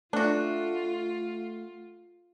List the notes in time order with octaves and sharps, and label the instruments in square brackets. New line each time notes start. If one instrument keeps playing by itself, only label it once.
[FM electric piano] A3 A4 [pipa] D4 F#4 [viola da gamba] F4